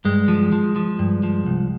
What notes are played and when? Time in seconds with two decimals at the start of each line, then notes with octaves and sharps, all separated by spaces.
0.05 G2 G#3
0.28 F3
0.52 F3
0.76 F3
0.99 G2
1.23 F3
1.46 C2